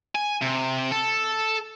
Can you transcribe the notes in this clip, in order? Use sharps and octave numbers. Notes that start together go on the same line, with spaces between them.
G#5
C3
A4